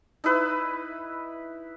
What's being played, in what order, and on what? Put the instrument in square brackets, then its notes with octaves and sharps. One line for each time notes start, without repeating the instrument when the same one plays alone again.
[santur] D#4 E4 B4 E5